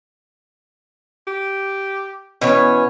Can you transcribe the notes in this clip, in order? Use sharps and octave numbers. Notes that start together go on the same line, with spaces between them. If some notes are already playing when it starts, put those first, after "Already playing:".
G4
B2 E3 C#4 C#5